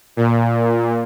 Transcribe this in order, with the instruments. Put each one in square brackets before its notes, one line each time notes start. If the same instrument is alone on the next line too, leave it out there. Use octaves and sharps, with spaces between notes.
[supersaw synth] A#2